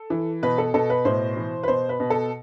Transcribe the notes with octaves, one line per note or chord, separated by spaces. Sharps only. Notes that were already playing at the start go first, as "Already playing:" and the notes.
Already playing: A4
E3
B2 B4
A4
B2 A4
B4
A2 C5
E3
B4
B2 C5
B4
B2
A4